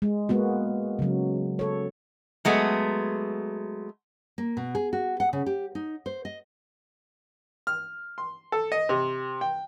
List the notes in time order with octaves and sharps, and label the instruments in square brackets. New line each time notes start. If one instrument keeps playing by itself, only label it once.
[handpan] G#3
G#3 A#3 B3 F#4
C#3 F#3
A4 C#5
[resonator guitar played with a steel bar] F#3 G#3 A3 B3
[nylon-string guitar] A#3
B2
G#4
F#4
F#5
C#3
G4
D#4
C5
D#5
[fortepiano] F6
C6
A4
D#5
C3
G5